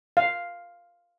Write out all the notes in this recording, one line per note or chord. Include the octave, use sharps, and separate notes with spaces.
F5